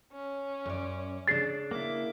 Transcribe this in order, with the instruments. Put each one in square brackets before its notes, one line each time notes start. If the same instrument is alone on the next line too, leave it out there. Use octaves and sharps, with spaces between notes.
[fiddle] C#4
[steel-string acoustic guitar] F#2 D5
[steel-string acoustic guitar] C#3 D4 [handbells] A6 C7
[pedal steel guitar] A#3 E4 [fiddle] D6